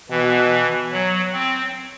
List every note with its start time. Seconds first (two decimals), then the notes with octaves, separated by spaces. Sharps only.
0.10 B2 E3
0.93 F#3
1.33 C4